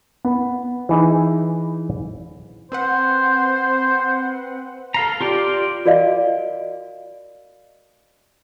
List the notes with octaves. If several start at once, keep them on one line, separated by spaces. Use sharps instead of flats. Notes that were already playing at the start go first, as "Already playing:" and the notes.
B3
E3 D#4 G#4
C4 B4 C5 F#5
A4 F5 A#5
F4 G4 D5
F#4 A#4 D5 D#5 F5